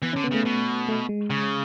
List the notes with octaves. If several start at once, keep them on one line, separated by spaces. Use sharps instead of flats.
E3 B3
C#4
D3
B3
C#3 A3
B2
A3
G#3
C#3